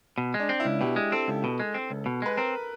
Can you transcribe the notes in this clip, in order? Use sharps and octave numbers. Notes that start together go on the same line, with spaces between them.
B2
G#3
D4
C4
E4
C#2
B2 G4
G#3
C4 A4
C#2
B2
G#3
C4
C#2
B2
G#3 B4
C4 A#4